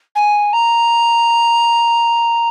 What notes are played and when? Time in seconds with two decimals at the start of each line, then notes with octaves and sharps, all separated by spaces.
0.15 G#5
0.53 A#5